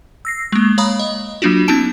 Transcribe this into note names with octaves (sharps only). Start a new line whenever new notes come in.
E6 A#6 C7
G#3 A#3
C#5 F5 A#5 B5 D#6
D#5
F#3 A#3 D4 F4 F#4
B3 C#4 D#4 A5 D7 E7